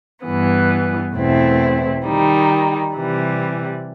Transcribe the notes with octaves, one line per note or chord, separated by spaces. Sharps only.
G2 E3 B3
E2 B2 A3 C4 E4
D#3 G3 D#4
C3 E3 G3